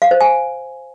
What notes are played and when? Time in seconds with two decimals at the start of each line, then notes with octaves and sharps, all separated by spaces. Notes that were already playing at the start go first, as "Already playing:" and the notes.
0.02 F5
0.11 C5
0.21 G#5